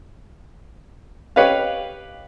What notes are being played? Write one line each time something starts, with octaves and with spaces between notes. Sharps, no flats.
G4 B4 C#5 D#5 F5